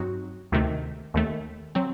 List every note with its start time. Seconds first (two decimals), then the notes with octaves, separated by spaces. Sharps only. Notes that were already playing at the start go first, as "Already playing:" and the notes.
Already playing: G2 F#3 C4 D#4 F#4
0.52 D2 C3 D#3 A3
1.14 D#2 D#3 A3
1.75 F#3 C4